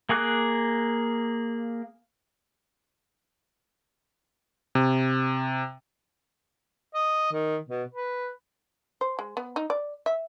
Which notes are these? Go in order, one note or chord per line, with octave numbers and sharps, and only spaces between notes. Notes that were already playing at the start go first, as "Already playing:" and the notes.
A#3 G#4 D6 F#6
C3
D#5
D#3
B2
B4
C5
G#3
B3
D#4
D5
E5